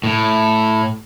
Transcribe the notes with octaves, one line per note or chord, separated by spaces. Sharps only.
A2